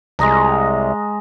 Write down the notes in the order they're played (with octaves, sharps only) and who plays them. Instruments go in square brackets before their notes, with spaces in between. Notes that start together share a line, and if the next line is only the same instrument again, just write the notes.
[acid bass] C2 [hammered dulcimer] G#3 D#5 A#5